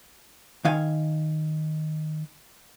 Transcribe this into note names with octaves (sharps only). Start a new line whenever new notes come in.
D#3 F5 G#5